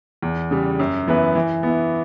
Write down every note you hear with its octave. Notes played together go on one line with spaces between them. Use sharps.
E2
C#3 G3
F#2
E3 B3 E4 B4
E3
B3 E4